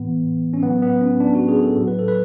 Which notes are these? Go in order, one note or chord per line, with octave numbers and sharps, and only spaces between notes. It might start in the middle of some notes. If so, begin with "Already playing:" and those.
Already playing: A2 E3 B3
C#4
A2 F#3 B3
B3
C#4
D4
F#4
G#4
A4
A2 F#3
B4
A4
B4